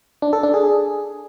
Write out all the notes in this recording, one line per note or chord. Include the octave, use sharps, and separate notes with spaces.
D4
A4
D4
G#4